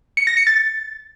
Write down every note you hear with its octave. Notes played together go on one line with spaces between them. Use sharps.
C#7
A#6
C#7
A6